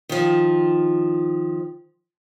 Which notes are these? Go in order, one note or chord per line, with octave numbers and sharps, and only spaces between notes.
D#3 F3